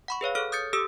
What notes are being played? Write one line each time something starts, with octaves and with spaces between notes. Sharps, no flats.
F#5 B5 C#6
G#4 B4 C#5 F5
G#4 A4 C#5 F6
D#6 G6 A6 C#7
G4 A4 D#6 E6